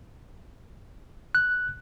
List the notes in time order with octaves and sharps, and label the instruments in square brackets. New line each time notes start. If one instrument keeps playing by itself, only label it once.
[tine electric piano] F#6